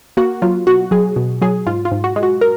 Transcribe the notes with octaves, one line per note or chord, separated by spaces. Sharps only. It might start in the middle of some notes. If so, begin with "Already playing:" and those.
A#3 F#4
F#3 F4
B2 F#4
F#3 G#4
B2
F#3 G#4
G#2 F4
F4
G#2
F#4
G#3
F#4
A#4